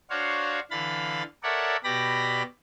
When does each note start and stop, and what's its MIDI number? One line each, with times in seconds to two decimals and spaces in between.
0.10 0.60 62
0.10 0.60 66
0.10 0.60 72
0.10 0.60 73
0.10 0.60 77
0.71 1.23 50
0.71 1.23 52
0.71 1.23 77
0.71 1.23 83
0.71 1.23 93
1.43 1.76 69
1.43 1.76 70
1.43 1.76 73
1.43 1.76 74
1.43 1.76 76
1.43 1.76 78
1.84 2.43 47
1.84 2.43 67
1.84 2.43 74
1.84 2.43 83
1.84 2.43 94